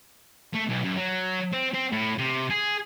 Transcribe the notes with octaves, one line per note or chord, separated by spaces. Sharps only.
A3
B1
F#2
F#3
C4
C4
A2
C3
G#4